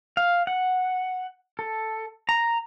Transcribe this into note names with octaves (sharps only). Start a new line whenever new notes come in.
F5
F#5
A4
A#5